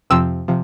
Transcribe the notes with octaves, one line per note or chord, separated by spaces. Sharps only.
F2 C3 F3 C4 E6
C3 F3